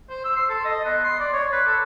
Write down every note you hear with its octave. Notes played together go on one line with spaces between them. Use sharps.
C5
E6
C6
A4
D#5
B3
C6
D5
C#5
B4
A4